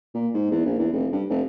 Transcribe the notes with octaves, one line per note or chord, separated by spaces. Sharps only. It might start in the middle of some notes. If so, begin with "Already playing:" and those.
A#2
G#2
E2
A#1
E2
F1
G2
F1